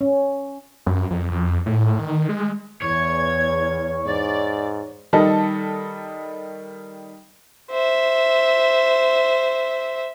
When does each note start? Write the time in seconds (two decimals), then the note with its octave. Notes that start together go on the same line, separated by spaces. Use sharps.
0.01 C#4
0.86 F#2
1.11 F2
1.31 F2
1.66 A2
1.99 D#3
2.29 G#3
2.82 E2 C#5 G#6
4.06 G#2 D5
5.13 D#3 G3 A4 D#5
7.71 C5 E5